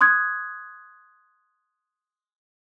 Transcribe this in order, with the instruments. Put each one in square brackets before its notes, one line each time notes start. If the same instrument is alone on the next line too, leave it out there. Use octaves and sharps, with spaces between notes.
[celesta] C6 D#6 F#6 G#6